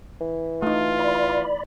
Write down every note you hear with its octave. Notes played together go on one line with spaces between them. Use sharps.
E3
A3 D#4 F4
D5 B5